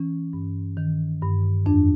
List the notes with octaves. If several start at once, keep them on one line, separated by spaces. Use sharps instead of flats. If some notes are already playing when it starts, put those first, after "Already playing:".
Already playing: E3 C#4
G2
D#3
G2
F2 D4